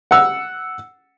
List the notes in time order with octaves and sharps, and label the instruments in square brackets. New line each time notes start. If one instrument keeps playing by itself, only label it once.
[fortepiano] F#5 E6